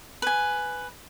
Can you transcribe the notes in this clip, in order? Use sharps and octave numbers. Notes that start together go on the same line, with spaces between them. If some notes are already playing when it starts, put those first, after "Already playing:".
B4 G#5